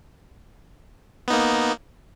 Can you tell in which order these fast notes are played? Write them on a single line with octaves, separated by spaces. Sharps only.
B3 D#4 A#3